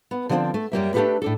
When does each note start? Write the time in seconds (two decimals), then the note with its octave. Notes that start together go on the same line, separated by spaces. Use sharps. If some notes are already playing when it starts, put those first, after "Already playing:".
0.11 B3
0.29 D3 F3 G3 A3 C4 D4
0.54 A3
0.72 F#2 G3 A#3 E5
0.94 A3 D4 D#4 G4 A4 B4
1.22 A2 D4 A4